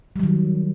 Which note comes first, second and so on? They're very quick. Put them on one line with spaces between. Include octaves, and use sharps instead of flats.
G3 F#3 D#3